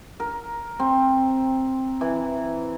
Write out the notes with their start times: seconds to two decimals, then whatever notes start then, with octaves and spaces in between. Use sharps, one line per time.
0.20 A#4
0.79 C4
2.01 E3